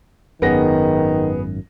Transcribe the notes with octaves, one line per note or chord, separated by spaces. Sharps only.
G#1 F#2 D#3 B3 G#4 A#6